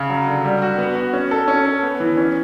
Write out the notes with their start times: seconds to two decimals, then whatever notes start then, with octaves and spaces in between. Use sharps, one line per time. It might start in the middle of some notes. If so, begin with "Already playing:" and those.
Already playing: C#3
0.09 F#3
0.27 D3
0.44 G3
0.62 F#4
0.78 B3
0.95 F#4
1.13 C#4
1.31 A4
1.48 C#4
1.65 A4
1.83 B3
2.00 E3
2.17 C#4